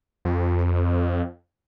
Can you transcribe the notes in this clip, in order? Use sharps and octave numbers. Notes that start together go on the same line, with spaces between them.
F2